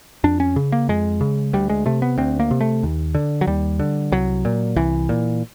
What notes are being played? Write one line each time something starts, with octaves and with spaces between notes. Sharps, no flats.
F2 D4
C#4
C#3
A#3
F2 G#3
C#3
D2 G3
G#3
C3 A3
B3
D2 C4
A#3
C3
A3
D#2
D3
F#3
D#2 G3
D3
C2 F#3
A#2
C2 E3
A#2